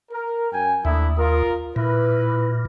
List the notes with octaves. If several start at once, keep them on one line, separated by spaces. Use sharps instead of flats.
A#4
F#2 G5 G#5
D#2 A3 D4 E4
F4 A#4
A#2 E4 B4